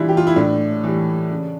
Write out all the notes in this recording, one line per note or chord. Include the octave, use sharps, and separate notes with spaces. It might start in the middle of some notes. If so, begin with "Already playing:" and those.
Already playing: C#3 E3 G3 D4 E4 F4
G4
F4
E4
A2 D4
E3 G3
C#3